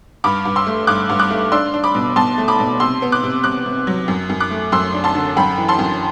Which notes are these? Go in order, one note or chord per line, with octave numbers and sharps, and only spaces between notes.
G2 B5 D6
G2
C6 E6
A3
G2 D6 F#6
G2
D6 F#6
A3
D4 C6 E6
D4
B5 D6
B2
B2 A5 C6
A3
B5 D6
B2
C3 C6 E6
B3
D6 F#6
C3
C3 D6 F#6
C3
F#3
F#2
F#2
D6 F#6
A3
F#2 C6 E6
D4
A5 C6
D3
F#2 G5 B5
E3
A5 C6
F#2